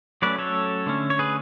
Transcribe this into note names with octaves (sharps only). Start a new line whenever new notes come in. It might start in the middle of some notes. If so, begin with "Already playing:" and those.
F#3 A3 C#4 B4 D5
A4 C#5
D3 A3 C#4
C#5
G#4 B4